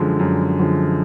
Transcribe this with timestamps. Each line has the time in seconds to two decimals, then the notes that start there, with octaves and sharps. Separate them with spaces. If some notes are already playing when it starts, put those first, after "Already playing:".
Already playing: F#2 D3 F3 G#3
0.19 F#2
0.60 D3 F3 G#3